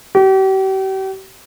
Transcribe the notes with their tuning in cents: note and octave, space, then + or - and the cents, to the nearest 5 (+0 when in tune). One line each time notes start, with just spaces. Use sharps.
G4 -40